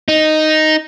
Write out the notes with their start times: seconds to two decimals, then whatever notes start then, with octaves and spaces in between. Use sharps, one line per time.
0.08 D#4